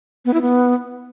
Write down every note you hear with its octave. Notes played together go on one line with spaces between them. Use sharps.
B3
E4
B3